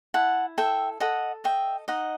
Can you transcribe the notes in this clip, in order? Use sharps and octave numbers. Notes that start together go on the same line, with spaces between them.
E4 F#5 A5
A4 E5 G5
A4 D#5 F#5
D#5 E5 G5
D#4 D#5 F#5